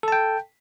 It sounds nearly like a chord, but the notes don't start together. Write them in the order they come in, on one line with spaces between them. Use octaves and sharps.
A4 A5 G5